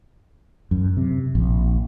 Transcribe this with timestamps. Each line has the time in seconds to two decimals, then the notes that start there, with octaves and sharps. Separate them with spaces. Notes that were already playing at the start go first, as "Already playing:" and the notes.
0.71 F#2
0.97 C3
1.35 A#1